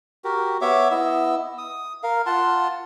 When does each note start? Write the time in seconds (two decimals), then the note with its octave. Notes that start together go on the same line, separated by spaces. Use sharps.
0.24 F#4 G4 A#4
0.61 B3 C#5 E5 D6
0.91 B3 E4 D#5 E6
1.58 D#6
2.03 A#4 F5
2.26 F4 F#5 A5 C6